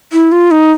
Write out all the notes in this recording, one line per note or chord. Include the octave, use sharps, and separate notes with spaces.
E4
F4
D#4